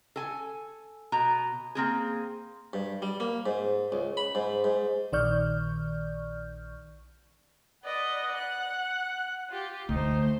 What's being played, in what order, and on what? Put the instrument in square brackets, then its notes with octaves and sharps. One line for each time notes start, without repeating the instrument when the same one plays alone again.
[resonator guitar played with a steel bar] A4 G#5
B2 A#5
A#3 C4 G#4
[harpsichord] G2
G3
A#3
G#2
C#2
B5
G#2
G#2
[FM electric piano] A#1 D#3 D5 C#6 F6 G6
[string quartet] B4 D5 D#5 [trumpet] F#5
[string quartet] F#6
F4 G4
[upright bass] D2 [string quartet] A3 C5 [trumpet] D#4